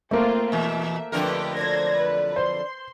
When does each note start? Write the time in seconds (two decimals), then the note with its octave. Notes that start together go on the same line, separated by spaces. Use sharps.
0.11 F3 A3 A#3 C4 F4
0.52 E2 B2 E5
1.12 F2 D3 G4 A#4 B4 G5
1.57 F#3 G3 D4 C5 G#6 A#6
1.96 B4
2.36 C5 C6